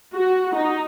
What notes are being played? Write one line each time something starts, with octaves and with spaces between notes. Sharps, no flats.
F#4
D#4